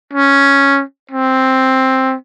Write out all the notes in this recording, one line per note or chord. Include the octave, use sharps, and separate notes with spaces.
C#4
C4